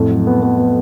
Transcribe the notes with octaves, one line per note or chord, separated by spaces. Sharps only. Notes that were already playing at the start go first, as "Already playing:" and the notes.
Already playing: F2 A2
F#3
B3
B3
B3